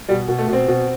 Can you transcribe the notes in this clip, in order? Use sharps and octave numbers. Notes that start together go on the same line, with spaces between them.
B2 G3
B2
A3
B2 C4
B2